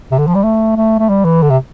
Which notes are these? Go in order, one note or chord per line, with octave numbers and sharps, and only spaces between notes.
C3
D3
F3
G3
A3
A3
A3
G3
E3
D3
C3